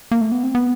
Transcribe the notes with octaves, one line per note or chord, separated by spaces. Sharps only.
A#3
A3
B3
C4
B3